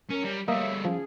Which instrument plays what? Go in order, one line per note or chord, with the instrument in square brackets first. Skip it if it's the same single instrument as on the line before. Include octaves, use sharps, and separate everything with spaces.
[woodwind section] F#3 A#4 [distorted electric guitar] C#4
[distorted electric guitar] G3
[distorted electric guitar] G3 A3 [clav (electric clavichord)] A#3 D#5 [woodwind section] C#5 E5
[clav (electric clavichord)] F3 [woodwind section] C#4 G#4